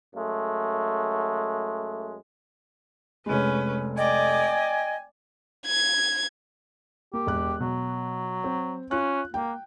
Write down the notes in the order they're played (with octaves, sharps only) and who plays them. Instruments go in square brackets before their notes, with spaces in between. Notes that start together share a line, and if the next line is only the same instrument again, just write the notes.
[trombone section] F#2 G#3 A3
[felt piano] F1 G#3 [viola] C#4 B4
[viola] D5 [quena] D#5 [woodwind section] G5 G#5
[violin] G#6
[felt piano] A#3 [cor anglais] G4
[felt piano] E1 F#6
[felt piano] B2 [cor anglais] F#3
[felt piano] C4
[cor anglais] C#4 [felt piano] F4 F#6
[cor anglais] A#3 [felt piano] G5